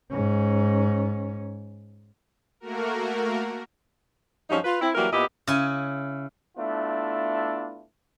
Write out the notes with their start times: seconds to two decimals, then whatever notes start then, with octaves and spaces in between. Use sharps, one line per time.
0.12 G#2 C#4
2.60 A3 A#3 F#4 A#4
4.50 G2 F3 F#3 C#4 D#4
4.64 F4 B4
4.81 C4 E4
4.95 E3 F#3 G3 A#3 F#4 A#4
5.12 A#2 B3 E4 G4 D#5
5.47 C#3 E4 G#5
6.56 A3 B3 D4 E4 F4